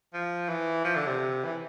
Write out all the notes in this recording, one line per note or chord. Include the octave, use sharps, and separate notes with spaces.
F3
E3
F3
D3
C3
E3